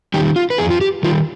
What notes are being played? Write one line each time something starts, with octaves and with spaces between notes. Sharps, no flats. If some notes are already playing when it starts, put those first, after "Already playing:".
D#3 G3 G4
F4
B4
F2 G#4
F4
G4
D#3 G3 F4